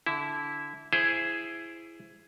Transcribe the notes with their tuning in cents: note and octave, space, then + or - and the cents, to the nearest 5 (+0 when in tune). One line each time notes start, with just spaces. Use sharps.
D3 -25 E4 -10
E4 +15 G#4 +5 C5 +0